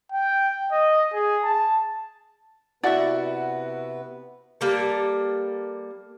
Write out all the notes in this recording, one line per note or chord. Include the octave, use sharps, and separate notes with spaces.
G5
D#5
G#4
A5
C3 B3 E4 F#4 B4 D5 E5 F#5
G3 A#3 A4